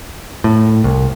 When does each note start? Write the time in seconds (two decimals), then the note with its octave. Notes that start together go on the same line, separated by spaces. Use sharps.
0.44 A2
0.84 C2